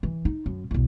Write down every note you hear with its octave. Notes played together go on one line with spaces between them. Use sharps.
E3
D#4
F#2
B1 E2